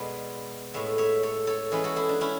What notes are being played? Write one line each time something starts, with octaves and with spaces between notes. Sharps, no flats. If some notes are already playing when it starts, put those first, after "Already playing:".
Already playing: B2 G#3 B3 B4 D5
A2 G#3 B3 C#5 E5
C#5 E5
A4 C#5
A4 C#5
E3 G#3 C#4 G#4 B4
F#4 A4
E4 G#4
D4
C#4 E4